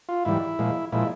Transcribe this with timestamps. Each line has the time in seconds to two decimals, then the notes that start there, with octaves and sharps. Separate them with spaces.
0.09 F4
0.25 G#2 E3 G3 E4
0.59 A#2 F3 G#3
0.92 A#2 F3 G#3 E4